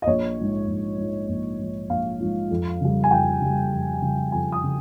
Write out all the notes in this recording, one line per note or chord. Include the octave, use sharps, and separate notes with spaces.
D#5
A#1 C#5
G#2 F3
A#1
G#2 F3
A#1
G#2 F3
A#1 F5
G#2 F3
F2
C#3 G3
G#5
F2 G5
C#3 G3
F2
C#3 G3
F2 G#5
D#6
C#3